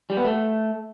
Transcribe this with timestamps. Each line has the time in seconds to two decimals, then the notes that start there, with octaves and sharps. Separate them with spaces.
0.10 G3
0.17 B3
0.25 A3